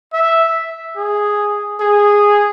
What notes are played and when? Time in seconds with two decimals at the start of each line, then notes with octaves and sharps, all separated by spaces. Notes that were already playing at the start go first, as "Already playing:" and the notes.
0.13 E5
0.97 G#4
1.81 G#4